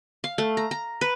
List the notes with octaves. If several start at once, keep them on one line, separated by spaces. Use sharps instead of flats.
F5
A3
A#5
A#5
B4